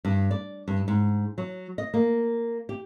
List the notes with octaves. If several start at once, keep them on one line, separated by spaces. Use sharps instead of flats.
G2
D5
G2
G#2
F#3
D#5
A#3
G4